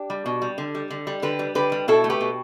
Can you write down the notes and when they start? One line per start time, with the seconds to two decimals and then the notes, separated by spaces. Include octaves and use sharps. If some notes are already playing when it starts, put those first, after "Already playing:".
Already playing: D4 G4
0.10 G3
0.26 B2
0.42 G3
0.58 D3
0.75 G3
0.90 D3
1.07 G3
1.22 D3 G4 B4
1.39 G3
1.55 D3 G4 B4
1.72 G3
1.88 B2 E4 A4
2.04 A3
2.10 G4 B4
2.21 B2